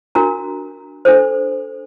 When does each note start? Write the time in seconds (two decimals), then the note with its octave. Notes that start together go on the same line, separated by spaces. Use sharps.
0.15 D4 F#4 A#4 A#5
1.05 D4 A4 C5